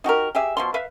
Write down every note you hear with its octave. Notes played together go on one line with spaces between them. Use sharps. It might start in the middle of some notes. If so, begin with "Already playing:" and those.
D#4 F#4 G4 A#4
G4 G#4 E5
B2 F3 C6
B4 E5 F5